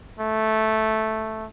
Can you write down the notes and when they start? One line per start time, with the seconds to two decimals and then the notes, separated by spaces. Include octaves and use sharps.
0.20 A3